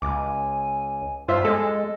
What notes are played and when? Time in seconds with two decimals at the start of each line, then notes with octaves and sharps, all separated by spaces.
0.02 C#2 G#5 D6
1.28 G2 F4 C5 E5 C6
1.45 G#3 A4 D#5